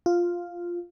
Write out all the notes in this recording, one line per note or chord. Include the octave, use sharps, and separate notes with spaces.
F4